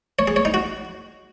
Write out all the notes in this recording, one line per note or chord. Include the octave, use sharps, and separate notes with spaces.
C#5
G#4
C#5
D#4
F#4